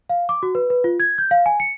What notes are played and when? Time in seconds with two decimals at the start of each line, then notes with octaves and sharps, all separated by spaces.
0.10 F5
0.29 D6
0.43 F#4
0.55 B4
0.70 B4
0.84 F4
1.00 G#6
1.18 G6
1.31 F5
1.46 G#5
1.60 C#7